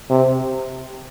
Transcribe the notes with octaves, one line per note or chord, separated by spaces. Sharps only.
C3